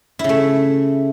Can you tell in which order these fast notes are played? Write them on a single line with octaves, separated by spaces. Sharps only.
E4 C#3 A3